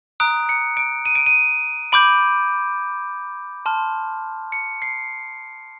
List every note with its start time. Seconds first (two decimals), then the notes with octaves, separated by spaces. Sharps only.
0.20 A#5 D#6 F#6 D7
0.49 C#7
0.77 D7
1.06 D#7
1.15 D7
1.27 D#7
1.92 B5 D6 G6 D7
3.66 A5 C6 F6
4.52 C#7
4.82 C7